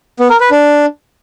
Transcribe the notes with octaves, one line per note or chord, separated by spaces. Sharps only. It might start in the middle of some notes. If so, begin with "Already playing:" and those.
B3
A#4
B4
D4